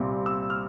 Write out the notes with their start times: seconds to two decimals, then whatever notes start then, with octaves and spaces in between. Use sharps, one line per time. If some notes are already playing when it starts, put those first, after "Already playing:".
Already playing: C2 A#2 G3 C4
0.26 E6
0.50 F6